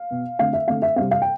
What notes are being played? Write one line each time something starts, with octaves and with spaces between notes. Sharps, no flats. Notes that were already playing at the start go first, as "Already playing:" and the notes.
Already playing: F5
B2 B3
D3 A3 C4 F5
E5
D3 A3 C4 F5
E5
C3 G3 C4 F5
F5
G5